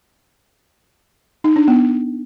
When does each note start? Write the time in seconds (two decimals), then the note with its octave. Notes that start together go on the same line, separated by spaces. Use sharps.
1.44 D#4
1.56 D4
1.68 B3